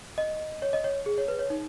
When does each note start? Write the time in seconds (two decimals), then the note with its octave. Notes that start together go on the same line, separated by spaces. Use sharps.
0.18 D#5
0.62 C#5
0.73 D#5
0.84 C#5
1.06 G#4
1.18 C#5
1.28 B4
1.39 C#5
1.50 D#4